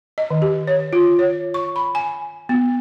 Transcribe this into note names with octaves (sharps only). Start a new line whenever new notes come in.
D#5
D#3
G4
C#5
F4
C#5
C#6
B5
G#5
B3